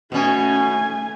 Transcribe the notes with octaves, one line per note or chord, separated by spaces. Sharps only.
B2 A3 C#4 G#5